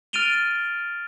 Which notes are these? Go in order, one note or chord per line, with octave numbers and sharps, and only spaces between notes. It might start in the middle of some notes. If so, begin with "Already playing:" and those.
F6 A6 D7 D#7 F7 G7